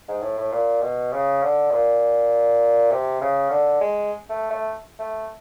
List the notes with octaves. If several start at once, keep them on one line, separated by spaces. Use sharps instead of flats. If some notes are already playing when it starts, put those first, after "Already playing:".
G#2
A2
A2
A#2
B2
C#3
D3
A#2
C3
C#3
D3
G#3
A3
A3
A3